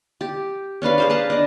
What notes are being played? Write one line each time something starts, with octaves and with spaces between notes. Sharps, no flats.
G4
C#4 D4 B4 F5
G#4 C5 F5
B4 F5 A5 A#5
D4 D#5